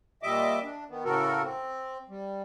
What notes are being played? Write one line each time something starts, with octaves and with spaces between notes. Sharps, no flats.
A#2 G3 D#5 E5 D6
D4
D#3 B3
A2 C#3 F#4 A4 A#4
C4
G3